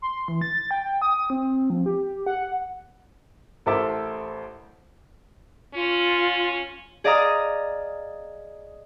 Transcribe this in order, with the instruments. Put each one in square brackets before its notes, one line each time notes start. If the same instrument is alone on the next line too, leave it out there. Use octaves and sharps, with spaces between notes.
[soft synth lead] C6
E3
A6
G5
D#6
C4
F3
G4
F#5
[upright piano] A1 A4 A#4 C5 E5 D6
[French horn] C#4 [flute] F4
[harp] G#4 D5 D#5 F5 A#5 D#6